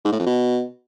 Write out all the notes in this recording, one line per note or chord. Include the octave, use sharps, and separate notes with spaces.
G#2
A2
F2
B2